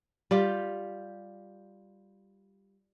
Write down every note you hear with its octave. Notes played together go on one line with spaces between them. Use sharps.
G3 F4 G4